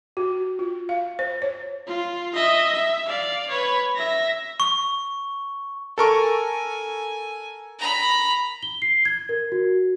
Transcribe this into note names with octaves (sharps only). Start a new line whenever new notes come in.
F#4
F4
F5
C5
C#5
F4
D#5 E5
E5
D5 F5
B4 C#5
E5 A#6
C#6
A4 A#4 G#5 C#6
A#5 B5
G7
C7
G#6
A#4
F#4